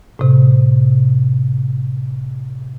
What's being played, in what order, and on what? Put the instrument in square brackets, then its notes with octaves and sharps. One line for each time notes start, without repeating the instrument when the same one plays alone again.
[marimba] A2 C3